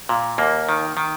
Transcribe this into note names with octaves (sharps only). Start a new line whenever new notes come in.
A#2
D#2 A#3
D#3
D#3